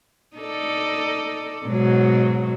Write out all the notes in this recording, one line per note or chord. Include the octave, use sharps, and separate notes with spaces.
D#4 A4 D5
G#2 B2 F#3